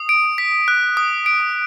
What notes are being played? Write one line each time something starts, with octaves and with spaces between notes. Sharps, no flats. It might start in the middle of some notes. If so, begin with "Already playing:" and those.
Already playing: D#6
D7
B6
F#6
D#6
D7